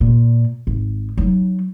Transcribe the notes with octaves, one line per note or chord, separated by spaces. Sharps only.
A#2
G#1
F#3 D#4